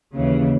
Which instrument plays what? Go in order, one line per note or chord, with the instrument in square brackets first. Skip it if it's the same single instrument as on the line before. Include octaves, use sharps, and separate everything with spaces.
[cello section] D#2 C#3 E3